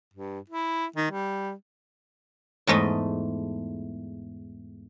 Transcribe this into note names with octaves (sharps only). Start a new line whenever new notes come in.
G2
E4
D#3
G3
E2 G#2 A3 D#5